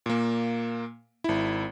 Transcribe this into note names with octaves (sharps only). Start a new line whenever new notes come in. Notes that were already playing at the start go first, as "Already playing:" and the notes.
A#2 A#3
G#1 E4